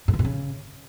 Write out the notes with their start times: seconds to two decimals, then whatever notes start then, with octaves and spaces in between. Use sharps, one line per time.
0.08 A2
0.13 B2
0.19 A#2
0.25 C#3